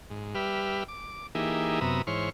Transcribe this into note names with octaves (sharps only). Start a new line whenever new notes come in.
G#2
G3 G4 B4 E5 F6
D6
E3 A#3 D#4 G4 G#4 E5
F#2 C3 B3 E5 A#5 D#6
G#2 E3 C5 C#5 F6